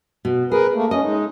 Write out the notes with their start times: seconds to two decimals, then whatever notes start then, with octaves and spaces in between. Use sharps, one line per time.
0.25 B2
0.52 G#4 A#4 B4
0.75 A3 A#3
0.91 C#4 D#5
1.04 G#3 D#4